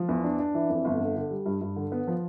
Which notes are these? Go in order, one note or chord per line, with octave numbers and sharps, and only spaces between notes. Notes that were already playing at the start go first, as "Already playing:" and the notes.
Already playing: F3
E2
D4
D4
E3
F2
G1
D3
D3
G3
G2
G2
D3
B3
F3